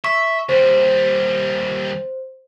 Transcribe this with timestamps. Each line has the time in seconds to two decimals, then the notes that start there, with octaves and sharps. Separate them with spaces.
0.04 E5 C#6
0.49 D#2 G3 C5